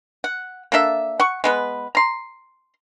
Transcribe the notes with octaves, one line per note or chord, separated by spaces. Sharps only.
F#5
A#3 D4 A4 E5
F#5 C#6
G#3 B3 B4
A#5 C6